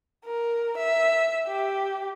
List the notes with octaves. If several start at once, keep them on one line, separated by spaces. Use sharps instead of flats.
A#4
E5
G4